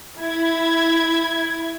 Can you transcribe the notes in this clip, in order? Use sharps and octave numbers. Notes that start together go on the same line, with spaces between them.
E4 G#6